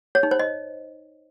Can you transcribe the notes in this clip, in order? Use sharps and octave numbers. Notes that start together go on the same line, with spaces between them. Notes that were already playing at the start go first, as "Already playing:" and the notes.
C#5
D#4
C5
D#5